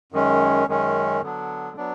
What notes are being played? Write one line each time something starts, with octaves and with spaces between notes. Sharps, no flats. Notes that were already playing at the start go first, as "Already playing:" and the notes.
F#2 D#3 G#3 C#4
F#2 D#3 G#3 C#4
D3 F#3 B3 D4
F#3 B3 D4